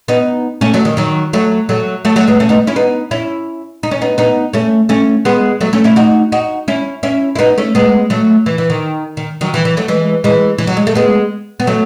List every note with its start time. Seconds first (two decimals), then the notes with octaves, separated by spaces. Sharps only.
0.08 B3 D#4
0.61 A3 C#4
0.74 F#3 A3
0.85 D#3
0.97 D#3 F#3
1.33 F#3 A3
1.69 F#3 A3
2.05 F#3 A3
2.16 F#3 A3
2.28 G#3 B3
2.40 A3 C#4
2.49 B3 D#4
2.67 C#4 E4
2.76 B3 D#4
3.11 C#4 E4
3.83 D#4
3.91 C#4
4.01 B3 D#4
4.18 B3 D#4
4.53 A3 C#4
4.89 A3 C#4
5.25 G#3 B3
5.61 F#3 A3
5.73 A3 C#4
5.84 C#4 E4
5.96 D#4 F#4
6.32 D#4 F#4
6.68 C#4 E4
7.03 C#4 E4
7.35 E4
7.39 B3 D#4
7.58 A3 C#4
7.75 G#3 B3
8.10 F#3 A3
8.46 E3
8.58 E3
8.70 D#3
9.17 D#3
9.41 D#3 F#3
9.54 E3
9.65 E3
9.77 F#3 A3
9.88 E3 G#3
10.24 E3 G#3
10.58 E3
10.67 F#3
10.77 G#3
10.87 A3
10.95 G#3 B3
11.60 B3
11.67 F#3 A3